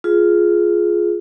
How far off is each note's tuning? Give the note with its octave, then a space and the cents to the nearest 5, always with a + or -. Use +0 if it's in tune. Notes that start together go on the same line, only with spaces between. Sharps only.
F4 +0 G#4 +10